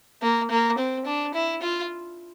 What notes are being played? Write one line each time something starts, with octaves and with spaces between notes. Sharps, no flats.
A#3
A#3
C4
D4
E4
F4